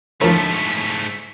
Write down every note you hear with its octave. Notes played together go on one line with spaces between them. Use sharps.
G#2 D3 F3 A3 A#4 C#5 B6